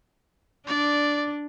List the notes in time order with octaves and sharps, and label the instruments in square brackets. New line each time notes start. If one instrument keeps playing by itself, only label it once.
[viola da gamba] D4 [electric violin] D5